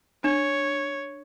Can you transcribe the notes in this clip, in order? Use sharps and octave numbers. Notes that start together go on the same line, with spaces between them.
D4 C#5